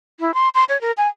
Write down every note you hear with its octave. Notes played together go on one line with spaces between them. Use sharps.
E4
C6
C6
C#5
A#4
G#5